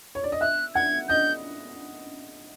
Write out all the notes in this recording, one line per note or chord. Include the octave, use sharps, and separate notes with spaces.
C#5
D5
D#5
E5 F#6
F#5 G#6
D#5 G6